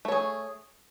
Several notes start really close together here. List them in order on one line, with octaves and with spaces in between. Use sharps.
A3 C#5 G#4